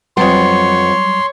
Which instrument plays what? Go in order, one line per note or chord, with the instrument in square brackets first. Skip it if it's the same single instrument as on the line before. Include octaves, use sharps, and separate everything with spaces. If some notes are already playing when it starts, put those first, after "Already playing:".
[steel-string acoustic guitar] F2 B3 [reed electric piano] F#3 G3 [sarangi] C#5 [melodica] C6